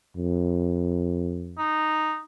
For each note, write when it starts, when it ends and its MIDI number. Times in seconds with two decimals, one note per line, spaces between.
0.17 1.63 41
1.58 2.19 63